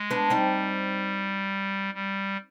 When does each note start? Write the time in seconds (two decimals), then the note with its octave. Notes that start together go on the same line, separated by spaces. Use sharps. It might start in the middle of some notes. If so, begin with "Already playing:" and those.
Already playing: G#3
0.11 B3 D4
0.30 G3 C4 D#4
1.94 G3